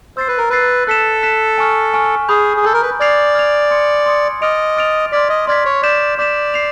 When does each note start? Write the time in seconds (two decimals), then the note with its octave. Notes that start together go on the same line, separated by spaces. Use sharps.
0.17 C5 E6 A6 C7
0.28 B4
0.38 A#4
0.50 B4 E6 A6 C7
0.87 A4 F#6 B6 E7
1.23 F#6 B6 E7
1.58 G#5 C#6 F6
1.94 G#5 C#6 F6
2.29 G#4 B5 D#6 G6
2.57 G#4
2.64 A4 B5 D#6 G6
2.74 A#4
2.82 B4
3.00 D5 F6 G#6 C7 F7
3.35 F6 G#6 C7 F7
3.71 C6 D#6 G#6 C#7
4.06 C6 D#6 G#6 C#7
4.42 D#5 D6 F6 A6 D7 F7
4.77 D6 F6 A6 D7 F7
5.12 D5 C6 F6 G#6 B6
5.29 D#5
5.47 D5 C6 F6 G#6 B6
5.65 C#5
5.83 D5 D6 G6 B6 E7
6.18 D5 D6 G6 B6 E7
6.54 C7 F7